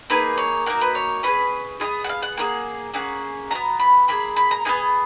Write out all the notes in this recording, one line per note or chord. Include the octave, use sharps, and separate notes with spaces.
A#3 D#4 G#4 B4
C#5
A#3 D#4 F#4 A#4
B4
C#5
C#4 F4 G#4 B4
B3 F4 G#4 D#5
F#5
F5
F#5
A#3 F4 G#4
A#3 C#4 G#4 F#5
B3 F#4 A#5
B5
A#3 F4 G#4 B5
B5
A#5
B3 D#4 G#4 G#5